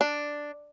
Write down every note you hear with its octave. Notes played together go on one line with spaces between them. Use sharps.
D4